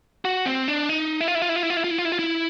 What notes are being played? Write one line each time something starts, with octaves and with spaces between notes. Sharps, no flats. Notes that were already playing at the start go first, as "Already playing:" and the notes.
F#4
C4
D4
D#4
E4
F4
E4
F4
E4
F4
E4
F4
E4
F4
E4
F4
E4
F4
E4